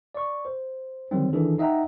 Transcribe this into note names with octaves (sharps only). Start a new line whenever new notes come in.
D5 C#6
C5
D3 D#3 F#3 G3 C4
D#3 E3 D4 G#4 A4
D#4 D#5 E5 F#5 G5 A#5